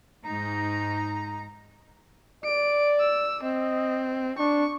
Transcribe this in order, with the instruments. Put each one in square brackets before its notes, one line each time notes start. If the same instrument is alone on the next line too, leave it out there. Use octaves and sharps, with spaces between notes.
[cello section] G#2 D#4 [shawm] A#5
[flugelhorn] D5 [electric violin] D7
[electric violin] E6
[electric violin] C4 [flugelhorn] D#5
[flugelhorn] D4 [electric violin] C#6